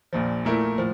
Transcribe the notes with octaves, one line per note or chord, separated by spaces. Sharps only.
A#1 A#2 F3
A#2 A3 E4 A#4
A2 F3